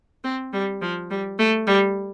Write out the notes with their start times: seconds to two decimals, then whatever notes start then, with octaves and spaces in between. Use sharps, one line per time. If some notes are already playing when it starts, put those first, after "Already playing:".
0.24 C4
0.53 G3
0.82 F3
1.11 G3
1.39 A3
1.67 G3